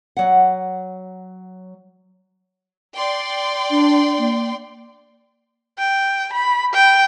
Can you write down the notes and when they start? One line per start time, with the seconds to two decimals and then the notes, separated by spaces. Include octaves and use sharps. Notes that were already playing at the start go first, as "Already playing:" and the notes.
0.17 F#3 F#5
2.95 D5 G5 C6
3.71 D4
4.18 A#3
5.79 G5
6.33 B5
6.74 G5